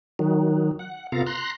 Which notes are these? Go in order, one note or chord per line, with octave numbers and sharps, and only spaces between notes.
D#3 F#3
F#5
C3 B3 F4 A4 F5 A#5
A#5 C6 F#6